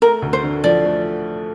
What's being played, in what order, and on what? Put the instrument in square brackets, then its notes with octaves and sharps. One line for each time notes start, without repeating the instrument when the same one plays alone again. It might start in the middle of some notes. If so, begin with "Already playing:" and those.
[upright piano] A3 [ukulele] A#4
[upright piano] D2
[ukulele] C5
[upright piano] D3
[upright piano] F3 [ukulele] D5
[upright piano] A3